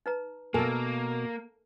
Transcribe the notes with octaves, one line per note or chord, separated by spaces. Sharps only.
D#4 B4 A#5
B2 A#3 B3 A4 A#4 G#5